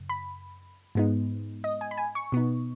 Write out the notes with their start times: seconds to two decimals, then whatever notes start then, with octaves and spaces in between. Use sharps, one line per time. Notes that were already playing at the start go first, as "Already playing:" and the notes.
Already playing: F#2 C#3
0.09 B5
0.95 G#2 G#3 B3 D#4
1.64 D#5
1.81 G#5
1.91 B5
1.98 G#5
2.15 C#6
2.32 B2 B3 D#4